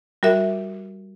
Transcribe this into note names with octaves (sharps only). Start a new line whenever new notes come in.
G3 F#4 A#4 E5